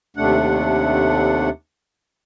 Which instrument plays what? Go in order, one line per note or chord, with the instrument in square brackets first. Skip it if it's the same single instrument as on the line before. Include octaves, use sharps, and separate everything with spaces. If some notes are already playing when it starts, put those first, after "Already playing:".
[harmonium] D#2 C3 A3 D4 F#5